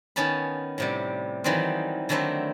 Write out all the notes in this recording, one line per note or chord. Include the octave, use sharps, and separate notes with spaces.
D#3 B3 C#4 A5 B5
A2 C3 G3
D#3 E3 F#3 G3 C4
D3 D#3 F#3 A3 C4 E4